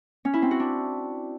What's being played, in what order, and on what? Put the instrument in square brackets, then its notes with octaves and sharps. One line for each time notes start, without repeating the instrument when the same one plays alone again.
[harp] C#4
E4
C4
F#4
D4